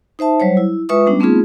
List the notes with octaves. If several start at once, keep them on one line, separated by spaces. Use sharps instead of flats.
D#4 C5 E5 A5
F#3 G3 C5 C#5
E4
G#3 F4 B4 E5 C#6 D#6
G3 B3 C#4 D4
A3 B3 C4 D#4 F4 G#4